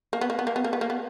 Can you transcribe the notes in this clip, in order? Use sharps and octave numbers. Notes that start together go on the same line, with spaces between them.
A#3
B3
A#3
B3
A#3
B3
A#3
B3
A#3
B3